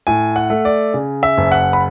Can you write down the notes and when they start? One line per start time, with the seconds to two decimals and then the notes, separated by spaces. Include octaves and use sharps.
0.07 A2 G#5
0.36 F#5
0.50 A3
0.65 D5
0.94 C#3
1.23 E5
1.38 F#1
1.52 F#5
1.73 B5